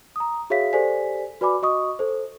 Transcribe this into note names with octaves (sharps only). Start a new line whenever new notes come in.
A#5 D#6
F#4 G#4 C#5 E5 F5 B6
G4 A4 C5 D5 G#5 B6
F#4 B4 D5 G#5 B5 D6
F#4 D#5 C#6 D#6
A4 C5